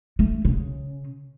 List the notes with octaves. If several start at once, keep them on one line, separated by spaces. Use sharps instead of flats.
A3
C#3